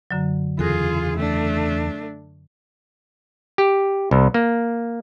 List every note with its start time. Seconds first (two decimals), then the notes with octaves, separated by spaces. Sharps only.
0.11 F#2 D3 F#3
0.59 E2 C#3 E3 F4 G#4 A4 F#6 A#6
1.17 A3 D4
3.58 G4
4.11 C2
4.34 A#3